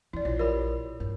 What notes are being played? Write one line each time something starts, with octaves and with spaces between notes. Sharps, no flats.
E2 E4 D5
A#1 E4 F4 C#5
G4 A#4 C#5 D5 B5
E2 G2